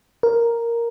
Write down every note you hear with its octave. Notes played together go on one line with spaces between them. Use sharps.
A#4